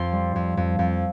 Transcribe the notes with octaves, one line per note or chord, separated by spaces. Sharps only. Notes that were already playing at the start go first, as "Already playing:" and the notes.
Already playing: F2 C6
G3
F2
F2
F2